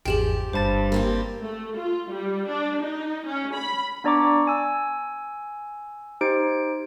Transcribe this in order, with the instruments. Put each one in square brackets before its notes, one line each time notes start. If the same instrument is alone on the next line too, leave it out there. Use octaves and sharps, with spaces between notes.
[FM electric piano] G#1 E2 G#4 [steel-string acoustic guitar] F3 G4 [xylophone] G5 E7 F#7
[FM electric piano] G1 B5 A6 [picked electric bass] G2 [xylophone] C5 A5
[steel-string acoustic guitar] A#3 C4 G4
[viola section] A3
F4
G3
D4
D#4
C#4
B5
[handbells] B3 D4 D5 A#5 C#6 D6
G#5 E6
D#4 G4 C5 D7